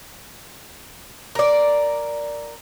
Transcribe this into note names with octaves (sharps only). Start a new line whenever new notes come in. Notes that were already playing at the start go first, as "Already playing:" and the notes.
A#4 D5